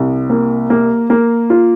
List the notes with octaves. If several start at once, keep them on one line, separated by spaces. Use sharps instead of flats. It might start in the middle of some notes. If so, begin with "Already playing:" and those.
Already playing: C2 C3
A#3
A#3
A#3
F4